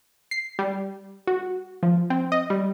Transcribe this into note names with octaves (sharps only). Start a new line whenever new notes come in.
C7
G3
F#4
F3
C4
D#5
G3